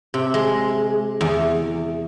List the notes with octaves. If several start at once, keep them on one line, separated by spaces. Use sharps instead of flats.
C3
G#3
E2